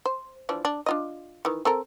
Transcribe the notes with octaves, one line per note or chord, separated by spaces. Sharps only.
C5
E3 F3 D4
D4
D4 F4 D#5
D#3 E3
C4 A4 A#4